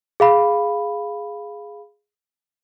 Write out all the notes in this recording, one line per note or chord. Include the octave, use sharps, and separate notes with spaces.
G#4 F5 B5